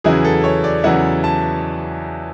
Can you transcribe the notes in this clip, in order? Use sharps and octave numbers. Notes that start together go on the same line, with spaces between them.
E2 C#3 F#3 B3 E4 G#4
A4
C#5
D5
E2 C#3 F#3 B3 E4 F#5
A5